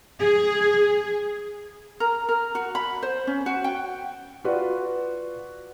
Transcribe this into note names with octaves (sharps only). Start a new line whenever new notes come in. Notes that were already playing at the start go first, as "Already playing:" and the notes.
G#4
A#4
A#4
F#4
B5
C5
C#4
F#4
G5
F4 F#4 B4 D5